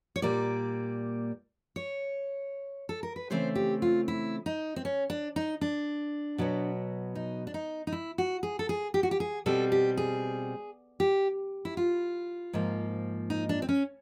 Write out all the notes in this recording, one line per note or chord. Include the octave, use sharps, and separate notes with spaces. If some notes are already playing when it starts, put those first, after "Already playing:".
C#5
A#2 G3 A#3 D5
C#5
A4
A#4
B4
C#3 E3 A3 C4 C5
G4
F4
E4
D#4
C4
C#4
D4
D#4
D4
B2 F#3 B3
D#4
D4
D#4
D#4
E4
F#4
G#4
A4
G#4
G4
F#4
G4
G#4
B2 G3 C4 A4
G4
G#4
G4
E4
F4
G#2 F3 A#3
D#4
D4
C4
C#4